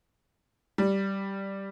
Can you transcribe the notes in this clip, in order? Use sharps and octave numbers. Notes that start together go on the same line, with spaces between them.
G3